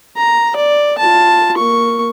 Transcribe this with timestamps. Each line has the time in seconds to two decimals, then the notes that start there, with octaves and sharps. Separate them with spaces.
0.17 A#5
0.56 D5
0.98 F4 A5
1.57 A#3 C#6